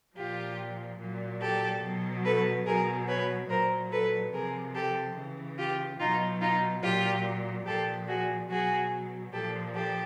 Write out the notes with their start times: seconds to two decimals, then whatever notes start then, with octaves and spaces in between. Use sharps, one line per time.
0.16 A#2 F3 F4 G4
0.99 A#2 F#3
1.41 G4 A4
1.82 B2 F#3
2.25 A4 B4
2.66 B2 F#3 G#4 A#4
3.08 B4 C#5
3.49 A#2 F#3 A#4 C5
3.91 A4 B4
4.33 C3 F3 G#4 A#4
4.75 G4 A4
5.16 C#3 E3
5.57 F4 G4
5.99 B2 F#3 D#4 F4
6.41 D#4 F4
6.82 A#2 F#3 F4 G4
7.66 A#2 F3 G4 A4
8.08 F#4 G#4
8.49 B2 F#3 F#4 G#4
9.33 A#2 F3 G4 A4
9.74 G4 A4